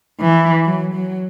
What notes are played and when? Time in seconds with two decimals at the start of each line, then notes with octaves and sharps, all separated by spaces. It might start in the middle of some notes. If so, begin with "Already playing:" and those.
0.20 E3
0.65 F#3
0.94 F#3